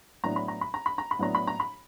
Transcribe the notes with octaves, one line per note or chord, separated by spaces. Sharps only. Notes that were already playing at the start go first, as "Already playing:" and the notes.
A2 F#3 B3 D4 A#5
B5
A#5
B5
A#5
B5
A#5
B5
A2 F#3 B3 D4 A#5
B5
A#5
B5